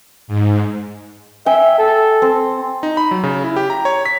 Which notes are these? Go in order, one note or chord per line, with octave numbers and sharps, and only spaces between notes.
G#2
E5 G5 G#5
A4
C4
D#4
B5
F#3
C#3
E4
G4
A#5
C#5
B6